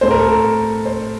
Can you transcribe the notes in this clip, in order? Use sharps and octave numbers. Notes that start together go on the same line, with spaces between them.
A2 A3 C4 C5
A#4
A4
A#4
C5